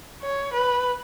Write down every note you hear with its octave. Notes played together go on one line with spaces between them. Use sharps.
C#5
B4